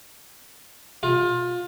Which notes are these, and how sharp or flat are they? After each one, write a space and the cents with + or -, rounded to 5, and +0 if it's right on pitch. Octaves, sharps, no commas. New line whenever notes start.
F4 +25